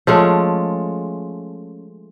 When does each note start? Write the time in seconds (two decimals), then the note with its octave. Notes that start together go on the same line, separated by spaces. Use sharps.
0.07 F3 G#3 A3 C#4